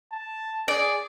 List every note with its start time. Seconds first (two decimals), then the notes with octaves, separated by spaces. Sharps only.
0.12 A5
0.68 G#4 D5